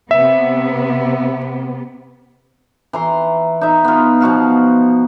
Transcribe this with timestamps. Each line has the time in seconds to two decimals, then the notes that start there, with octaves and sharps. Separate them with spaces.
0.11 C3 B3 E5
2.93 E3 A#5 C6
3.61 D#4 E5
3.84 B3 F4
4.21 B2 F3 F#4 F5